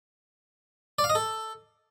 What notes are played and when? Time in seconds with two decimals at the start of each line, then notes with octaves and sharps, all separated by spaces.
0.99 D5
1.04 F5
1.10 D#5
1.15 A4